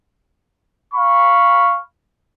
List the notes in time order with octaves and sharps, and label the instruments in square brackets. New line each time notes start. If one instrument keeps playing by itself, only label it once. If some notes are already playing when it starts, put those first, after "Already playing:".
[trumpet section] F5 B5 C#6